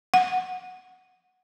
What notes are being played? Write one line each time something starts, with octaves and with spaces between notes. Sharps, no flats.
F#5